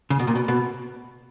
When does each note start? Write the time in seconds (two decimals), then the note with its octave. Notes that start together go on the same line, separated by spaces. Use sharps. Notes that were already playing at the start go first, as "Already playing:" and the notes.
0.10 C#3
0.19 B2
0.27 A#2
0.35 B2
0.48 B2